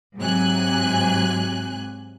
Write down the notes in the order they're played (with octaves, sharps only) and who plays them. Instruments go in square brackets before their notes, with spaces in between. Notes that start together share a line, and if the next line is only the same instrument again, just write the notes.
[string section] G#2 C3 F#3 G#5 F#6